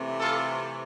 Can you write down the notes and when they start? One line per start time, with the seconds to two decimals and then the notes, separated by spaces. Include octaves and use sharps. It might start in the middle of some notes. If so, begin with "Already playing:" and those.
Already playing: C3 E3 A3
0.20 F4 A4